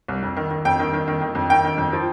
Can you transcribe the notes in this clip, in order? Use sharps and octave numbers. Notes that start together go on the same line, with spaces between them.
C2
F2
D#3
D#3
F2 G5
D#3
D#3
D#3
D#3
F2
D#3 G5
D#3
F2
F3